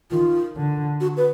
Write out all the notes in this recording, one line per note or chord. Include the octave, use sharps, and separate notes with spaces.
D#3 F4
D3
F#4
B4